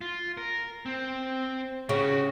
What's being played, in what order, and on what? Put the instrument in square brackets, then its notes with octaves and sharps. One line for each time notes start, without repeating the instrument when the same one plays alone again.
[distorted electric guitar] F4
A#4
C4
[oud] C#3 [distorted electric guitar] F#4 G4